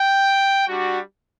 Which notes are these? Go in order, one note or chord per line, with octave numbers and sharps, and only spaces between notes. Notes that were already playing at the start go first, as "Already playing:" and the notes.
Already playing: G5
G3 D4 F#4